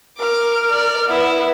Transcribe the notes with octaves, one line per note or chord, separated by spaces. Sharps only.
A#4 D6 F6
D5
B3 E4 B4 E6